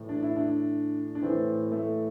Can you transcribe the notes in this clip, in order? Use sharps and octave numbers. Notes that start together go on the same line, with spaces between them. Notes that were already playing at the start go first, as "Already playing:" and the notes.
Already playing: A2 E3
D4
E4
D4
D4
A2 E3 C4
A3